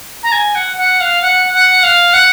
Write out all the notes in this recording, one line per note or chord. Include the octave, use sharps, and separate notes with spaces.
A#5
G#5
F#5
F#5
F5
F#5
F#5
F5
F#5